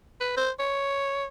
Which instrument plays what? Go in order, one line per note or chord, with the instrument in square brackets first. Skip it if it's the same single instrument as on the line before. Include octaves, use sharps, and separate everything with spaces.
[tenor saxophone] B4
C5
C#5